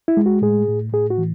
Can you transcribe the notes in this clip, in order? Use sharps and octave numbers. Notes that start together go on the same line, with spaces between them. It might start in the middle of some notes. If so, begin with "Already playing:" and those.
E4
G#3
F#4
A2 G#4
A2
A2 G#4
F#4
E3